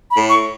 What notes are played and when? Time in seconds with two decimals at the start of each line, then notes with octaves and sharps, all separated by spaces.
0.11 B5
0.16 A2
0.29 C#6